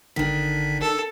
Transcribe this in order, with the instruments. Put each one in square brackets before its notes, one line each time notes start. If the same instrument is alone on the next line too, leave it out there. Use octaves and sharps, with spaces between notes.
[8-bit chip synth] G#1 D3 B6 [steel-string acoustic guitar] D#3 D4
[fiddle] A4